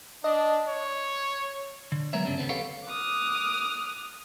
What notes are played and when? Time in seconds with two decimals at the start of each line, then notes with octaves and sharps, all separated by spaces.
0.24 D4 D#5
0.67 C#5
1.92 D3
2.13 F#3 G#3 B3 A#4 C#5 E5
2.25 G2 C#3 G3 B3 C#4 D4
2.38 D#2 C#3 B3 C4
2.49 G4 A4 B4 C#5 F5 F#5
2.88 D6 D#6 F6 F#6